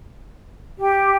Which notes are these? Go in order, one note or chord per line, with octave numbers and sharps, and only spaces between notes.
G4